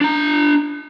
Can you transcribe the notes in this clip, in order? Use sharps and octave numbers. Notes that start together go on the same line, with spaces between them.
D4 A#5